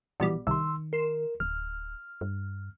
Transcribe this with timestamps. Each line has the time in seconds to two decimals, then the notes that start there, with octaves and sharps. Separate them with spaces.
0.20 A#1 B2 E3 G3
0.47 C2 D#3 C6 E6
0.93 A#4 C6 E7
1.40 D1 F6
2.21 G2